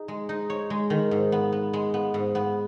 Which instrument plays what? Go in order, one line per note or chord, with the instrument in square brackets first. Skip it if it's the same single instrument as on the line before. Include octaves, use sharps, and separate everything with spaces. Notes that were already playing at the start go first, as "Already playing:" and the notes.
Already playing: [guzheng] D#4 G#4
G#3
D#4
C#5
G#3
D#3
G#2
B3
B3
G#3
B3
G#2
B3